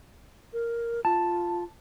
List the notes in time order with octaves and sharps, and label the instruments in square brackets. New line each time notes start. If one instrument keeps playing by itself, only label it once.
[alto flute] A#4
[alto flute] F4 [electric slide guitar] A5